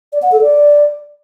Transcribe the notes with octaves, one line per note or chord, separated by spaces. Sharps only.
D5
F#5
A4
D5